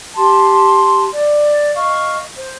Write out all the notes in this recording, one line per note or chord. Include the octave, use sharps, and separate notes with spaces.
G4 A5 C6
D5
D#5 F5 C#6
C5